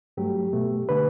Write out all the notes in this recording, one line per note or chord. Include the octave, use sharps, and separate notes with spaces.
G2 F#3 A3 G4
B2 A3
D3 A3 B4